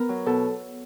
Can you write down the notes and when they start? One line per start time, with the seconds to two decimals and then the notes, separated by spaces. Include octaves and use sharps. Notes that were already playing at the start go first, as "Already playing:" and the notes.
Already playing: B3 A#4
0.09 F#3
0.26 B2 A4